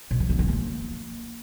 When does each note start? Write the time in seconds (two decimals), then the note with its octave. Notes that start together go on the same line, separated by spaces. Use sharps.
0.11 B2
0.20 F3
0.29 B3
0.39 E3
0.48 A#3